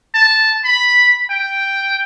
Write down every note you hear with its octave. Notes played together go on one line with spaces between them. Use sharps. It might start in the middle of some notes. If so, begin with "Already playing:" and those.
A5
B5
G5